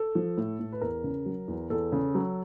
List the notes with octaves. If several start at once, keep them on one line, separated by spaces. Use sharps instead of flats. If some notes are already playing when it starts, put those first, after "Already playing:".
Already playing: A4
F3
A2
A2
B4
E2 A#4
C#3
F#3
E2
E2 A4
C#3
F#3